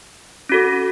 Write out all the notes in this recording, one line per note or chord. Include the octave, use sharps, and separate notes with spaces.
C#4 F#4 A4